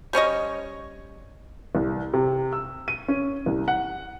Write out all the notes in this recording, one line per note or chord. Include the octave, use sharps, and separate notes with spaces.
G3 C#4 C#5 D#5
C2
C3
E6
D#7
C#4
C2
F#5